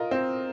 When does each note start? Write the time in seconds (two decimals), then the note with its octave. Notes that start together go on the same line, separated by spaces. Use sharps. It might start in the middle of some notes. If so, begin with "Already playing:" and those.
Already playing: F4 A#4 D#5
0.11 C4